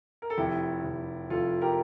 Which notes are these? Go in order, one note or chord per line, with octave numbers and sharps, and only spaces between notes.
A#4
A4
F1 E4 G4
F1
F1 F4 A4
G4 A#4